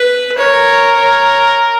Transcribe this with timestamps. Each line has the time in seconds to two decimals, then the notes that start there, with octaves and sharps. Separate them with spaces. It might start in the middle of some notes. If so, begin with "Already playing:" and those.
Already playing: B4
0.36 A#4 C#5
0.96 C#5